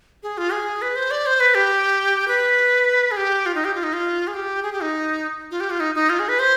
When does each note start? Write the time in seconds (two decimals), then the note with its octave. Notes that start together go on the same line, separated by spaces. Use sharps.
0.23 G#4
0.38 F4
0.52 G#4
0.82 B4
0.96 C5
1.11 D5
1.26 C5
1.40 B4
1.55 G4
2.28 B4
3.11 G#4
3.17 G4
3.46 F4
3.55 D#4
3.65 G4
3.75 F4
3.83 D#4
3.93 F4
4.27 G#4
4.34 G4
4.63 G#4
4.72 G4
4.82 D#4
5.51 F4
5.60 G4
5.70 F4
5.80 D#4
5.95 D#4
6.09 F4
6.19 G#4
6.29 B4
6.39 C5